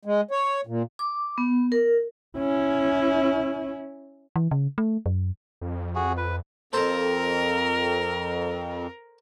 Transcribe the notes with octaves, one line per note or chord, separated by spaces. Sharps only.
G#3
C#5
A#2
D6
B3
A#4
C#4 E4
E3
C#3
A3
F#2
F2
F#4 G#4
B4
F2 A4 A#4 C5 A#5